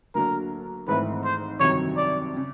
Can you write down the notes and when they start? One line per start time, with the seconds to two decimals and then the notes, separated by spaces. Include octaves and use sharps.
0.15 D2 D3 F#3 A#3 D4 A#4
0.88 G#1 G#2 E3 A3 C4 B4
1.24 C5
1.60 G1 F2 C3 D#3 F#3 C#5
1.97 D5
2.37 C#3